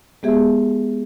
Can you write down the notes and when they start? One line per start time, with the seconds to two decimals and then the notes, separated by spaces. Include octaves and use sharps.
0.23 G#3 B3 G4 G#4 E5